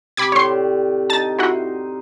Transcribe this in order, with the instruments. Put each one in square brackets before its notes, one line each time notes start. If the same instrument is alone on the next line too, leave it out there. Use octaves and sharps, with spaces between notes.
[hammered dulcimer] C3 G4 [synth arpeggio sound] B5 D6 G#6
[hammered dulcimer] A2 D5 [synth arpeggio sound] C#5 C6
[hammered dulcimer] D#4 [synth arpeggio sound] A5 A6
[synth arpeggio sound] E4 F#4 F#5 [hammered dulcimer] C5